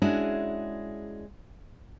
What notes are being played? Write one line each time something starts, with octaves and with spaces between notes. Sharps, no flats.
G#3 C#4 D4 E4 F#4 G#4